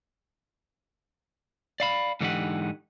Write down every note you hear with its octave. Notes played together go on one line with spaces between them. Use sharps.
D5 F5 B5
G#2 D3 E3 D#4 G4 F#5